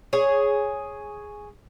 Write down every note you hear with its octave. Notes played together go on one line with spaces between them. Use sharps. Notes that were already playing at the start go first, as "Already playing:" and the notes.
G#4 C#5